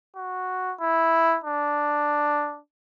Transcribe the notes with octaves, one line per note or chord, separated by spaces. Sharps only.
F#4
E4
D4